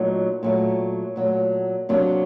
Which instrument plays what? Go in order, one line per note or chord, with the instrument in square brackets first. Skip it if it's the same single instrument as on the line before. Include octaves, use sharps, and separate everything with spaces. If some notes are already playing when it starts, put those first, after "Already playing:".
Already playing: [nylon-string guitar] A#2 F#3 A3 D#4
A#2 F#3 A3
A#2 F#3 A3
C3 F#3 A#3 D4